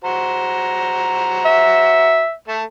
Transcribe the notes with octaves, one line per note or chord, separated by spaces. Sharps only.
F#4 C5 A#5
E5
A3 A5